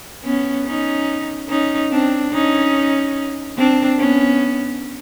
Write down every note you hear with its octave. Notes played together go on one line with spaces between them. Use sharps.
B3 C#4
C#4 D#4
C#4 D#4
C4 D4
C#4 D#4
C4 D4
B3 C#4